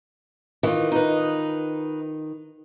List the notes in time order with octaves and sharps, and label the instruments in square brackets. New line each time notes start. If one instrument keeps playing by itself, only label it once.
[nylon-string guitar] D#3 F4 [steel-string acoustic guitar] E3
[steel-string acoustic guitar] D#4 B4